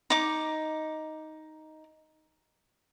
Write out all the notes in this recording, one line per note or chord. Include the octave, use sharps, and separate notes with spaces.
D#4 D6